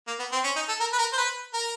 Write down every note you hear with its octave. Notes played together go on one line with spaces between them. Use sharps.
A#3
B3
C4
C#4
D#4
A4
A#4
B4
A#4
C5
B4
A#4